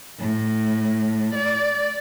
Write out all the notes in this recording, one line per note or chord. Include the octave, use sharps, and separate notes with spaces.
A2
D5